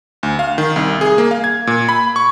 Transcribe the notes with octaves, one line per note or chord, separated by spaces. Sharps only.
D2
F5
D#3
C2
G#4
A#3
F5
G#6
A#2
B5
C#6